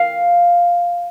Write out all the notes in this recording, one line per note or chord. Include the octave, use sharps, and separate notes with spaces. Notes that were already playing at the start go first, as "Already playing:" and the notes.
Already playing: F5